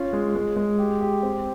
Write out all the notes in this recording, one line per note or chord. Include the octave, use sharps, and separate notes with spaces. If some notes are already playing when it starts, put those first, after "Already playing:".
Already playing: C#4 F4
G#3
G#3
G#3
G4
G4
C4